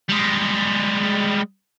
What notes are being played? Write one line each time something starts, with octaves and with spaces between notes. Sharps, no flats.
G3 G#3